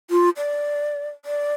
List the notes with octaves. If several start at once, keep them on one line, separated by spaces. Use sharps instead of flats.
F4
D5
D5